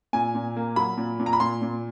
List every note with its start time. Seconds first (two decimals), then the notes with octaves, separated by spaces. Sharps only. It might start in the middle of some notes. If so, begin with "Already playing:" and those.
0.13 A#2 G#5
0.35 A#2
0.56 A#3
0.76 F#3 B5
0.98 A#2
1.20 A#2
1.26 A#5
1.33 B5
1.40 A#2 C6
1.62 A#2